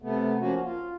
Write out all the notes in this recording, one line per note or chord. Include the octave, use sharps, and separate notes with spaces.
C3 A3 B3
F3 A#3 C#4 F#4
F4